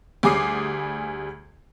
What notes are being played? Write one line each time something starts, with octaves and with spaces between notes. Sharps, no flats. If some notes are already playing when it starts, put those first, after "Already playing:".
D2 G3 G#4 D6 D#6 C7